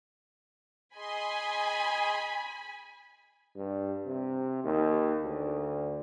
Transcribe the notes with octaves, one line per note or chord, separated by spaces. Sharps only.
G#4 D#5 G#5 B5 C6
G2
C3
D#2
D2